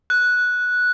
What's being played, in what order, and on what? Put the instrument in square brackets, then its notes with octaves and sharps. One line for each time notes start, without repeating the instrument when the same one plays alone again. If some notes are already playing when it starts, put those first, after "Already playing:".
[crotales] F#6